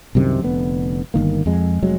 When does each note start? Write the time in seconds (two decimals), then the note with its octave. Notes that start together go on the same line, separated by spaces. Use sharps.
0.15 C2 F#2 C3 D#3
0.40 F1 D3 B3
1.14 G1 D#3 A#3
1.46 F2 G#3
1.82 F1 F#3 G#3